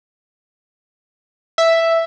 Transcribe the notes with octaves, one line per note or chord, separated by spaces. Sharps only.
E5